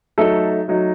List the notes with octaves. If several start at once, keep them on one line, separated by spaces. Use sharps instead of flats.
F#3 A3 D#4 A4
F#3 A3 D#4